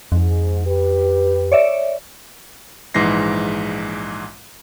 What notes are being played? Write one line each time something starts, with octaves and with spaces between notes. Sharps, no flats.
F2 G#2
G4 B4
C#5 D5 E5
A#1 G#2 E3 G#3 A#6 C7